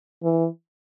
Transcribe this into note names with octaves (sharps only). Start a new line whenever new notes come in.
E3